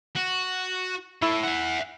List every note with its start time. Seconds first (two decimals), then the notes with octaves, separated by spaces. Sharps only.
0.16 F#4
1.22 E4 A4 C#5
1.43 E5 F#5